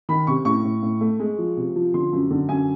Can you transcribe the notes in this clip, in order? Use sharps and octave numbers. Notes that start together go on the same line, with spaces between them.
D#3 B5
C3 C#6
A2 C#6
A2
A2
A3
G#3
F3
C3
F3
D3 C6
F#2
D3
F#2 G#5